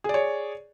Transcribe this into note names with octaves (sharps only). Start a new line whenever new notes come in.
G#4 C#5 D5